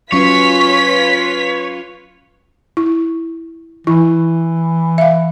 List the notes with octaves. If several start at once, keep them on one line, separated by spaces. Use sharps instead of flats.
F#3 C#4 F4 B4 C#5 B6
E4
E3 E4
E5 F5